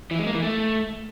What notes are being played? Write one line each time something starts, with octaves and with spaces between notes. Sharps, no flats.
E3
G#3
A#3
E3
A3